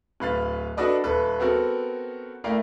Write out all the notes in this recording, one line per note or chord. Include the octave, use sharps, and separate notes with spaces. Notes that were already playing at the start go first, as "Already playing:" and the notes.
D1 B4 F5 A6
D4 F#4 A4 B4 D5 D#5
D#1 A4 B4
B3 C4 F#4 A4 A#4
A3 E4 A#4 D5 F5 G5